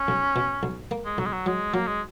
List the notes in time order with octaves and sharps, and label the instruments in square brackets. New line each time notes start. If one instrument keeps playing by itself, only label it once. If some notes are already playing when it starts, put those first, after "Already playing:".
Already playing: [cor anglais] C#4
[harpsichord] B1
B2
B1
A#3
[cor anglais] G#3
[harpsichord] B1 [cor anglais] F#3
[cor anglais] G#3
F#3
[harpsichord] F#3 [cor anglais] G#3
[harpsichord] F#3 [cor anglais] A#3
[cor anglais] G#3